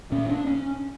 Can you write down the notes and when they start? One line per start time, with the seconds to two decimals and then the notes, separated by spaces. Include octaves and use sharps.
0.12 A#2 C#4
0.29 D4
0.47 C#4